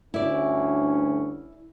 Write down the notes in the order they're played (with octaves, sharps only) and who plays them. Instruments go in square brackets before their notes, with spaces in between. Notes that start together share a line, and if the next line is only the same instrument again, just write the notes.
[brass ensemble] D2 G2 C#4 [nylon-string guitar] E4 D5